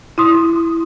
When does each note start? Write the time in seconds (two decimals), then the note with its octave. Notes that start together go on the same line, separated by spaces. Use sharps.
0.18 E4 C6 D#6